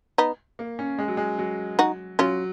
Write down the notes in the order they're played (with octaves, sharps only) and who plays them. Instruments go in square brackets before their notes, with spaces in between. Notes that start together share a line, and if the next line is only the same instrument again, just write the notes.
[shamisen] B3 D#4
[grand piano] A#3
C#4
G#3
F#3
G#3
F#3
[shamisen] D#4 F#4
[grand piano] F#3 [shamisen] C#4 F4